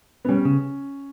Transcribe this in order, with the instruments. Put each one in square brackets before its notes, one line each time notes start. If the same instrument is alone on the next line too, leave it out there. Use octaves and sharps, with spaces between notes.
[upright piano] B3
[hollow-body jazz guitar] G3 [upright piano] C#4
[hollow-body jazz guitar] C#3